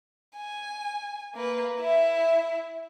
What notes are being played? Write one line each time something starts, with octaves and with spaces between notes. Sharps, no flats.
G#5
A#3 B4
E4 E5